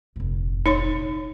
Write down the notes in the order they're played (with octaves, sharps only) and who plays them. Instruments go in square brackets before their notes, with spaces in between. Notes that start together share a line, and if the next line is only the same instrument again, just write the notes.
[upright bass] F1 A#1
[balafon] D#4 C#5 C6